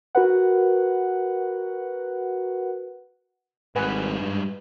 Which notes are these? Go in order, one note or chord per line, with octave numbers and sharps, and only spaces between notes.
F#4 A#4 B4 F#5
G#1 G#2 G3 B4 F#5 G#5
G2